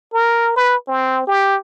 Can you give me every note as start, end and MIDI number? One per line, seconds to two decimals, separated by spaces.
0.14 0.53 70
0.56 0.76 71
0.88 1.23 60
1.27 1.57 67